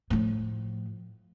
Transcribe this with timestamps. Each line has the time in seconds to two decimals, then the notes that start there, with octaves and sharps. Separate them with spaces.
0.10 A2 F3